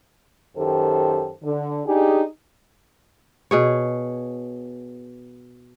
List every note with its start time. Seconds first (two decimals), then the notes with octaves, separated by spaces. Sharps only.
0.57 F#2 D#3 G4 A4 C5
1.43 D3
1.86 D4 D#4 G4 G#4
3.51 B2 G#4 C#5